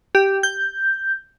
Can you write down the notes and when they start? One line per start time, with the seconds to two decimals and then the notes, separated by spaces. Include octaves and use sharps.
0.15 G4
0.43 G6